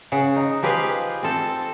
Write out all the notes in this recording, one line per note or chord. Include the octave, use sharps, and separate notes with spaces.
C#3 F#5
D#4
F3 G4 G#4 B4 F5
C4 A4